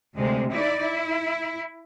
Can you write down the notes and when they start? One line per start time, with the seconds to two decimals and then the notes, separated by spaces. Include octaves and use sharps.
0.15 D2 C3 G#3
0.50 D#4 E4 D5
0.81 E4